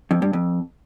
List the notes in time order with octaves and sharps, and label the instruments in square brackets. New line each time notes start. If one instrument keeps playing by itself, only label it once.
[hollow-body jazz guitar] F2
G2
F2